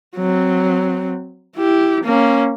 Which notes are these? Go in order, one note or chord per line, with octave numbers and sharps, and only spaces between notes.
F#3 C4
E4 G4
A#3 C#4